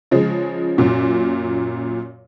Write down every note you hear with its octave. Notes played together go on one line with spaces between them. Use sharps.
C#3 F3 G#3
F#2 A#2